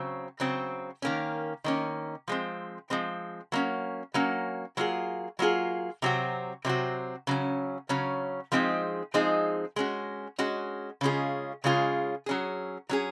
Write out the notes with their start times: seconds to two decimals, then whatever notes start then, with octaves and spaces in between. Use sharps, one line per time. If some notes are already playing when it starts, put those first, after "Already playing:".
Already playing: C#3 F#3 C4
0.40 C#3 F#3 C4
1.02 D#3 A#3 C#4
1.64 D#3 A#3 C#4
2.28 F3 G#3 C4
2.90 F3 G#3 C4
3.52 F#3 A#3 C#4
4.14 F#3 A#3 C#4
4.77 F#3 A#3 F4 G#4
5.39 F#3 A#3 F4 G#4
6.02 C3 F#3 C4 F#4
6.65 C3 F#3 C4 F#4
7.27 C#3 F#3 C#4
7.89 C#3 F#3 C#4
8.52 F3 G#3 C4 D#4 G#4
9.14 F3 G#3 C4 D#4 G#4
9.76 G#3 C#4 F#4
10.39 G#3 C#4 F#4
11.01 C#3 G#3 C#4 F4 G#4
11.64 C#3 G#3 C#4 F4 G#4
12.26 F#3 C#4 G#4
12.89 F#3 C#4 G#4